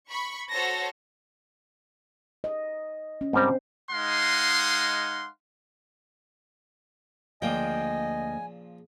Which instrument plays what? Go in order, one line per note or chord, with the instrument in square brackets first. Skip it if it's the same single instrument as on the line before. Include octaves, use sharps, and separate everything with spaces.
[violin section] B5 C#6
F#4 A4 C5 C#5 A5 A#6
[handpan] D#5
C#4
[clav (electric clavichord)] G#2 G3 A#4 [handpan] C4 C5
[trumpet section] G#3 D#4 F5 F#5 C6
[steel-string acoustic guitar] D2 A#3 G5 [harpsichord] A#2 C#3 F3 [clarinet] D#5 [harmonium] G#5